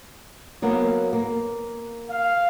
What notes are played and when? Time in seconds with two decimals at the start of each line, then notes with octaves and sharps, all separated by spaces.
0.62 F#3 A#3 B3
1.13 A#3
2.09 F5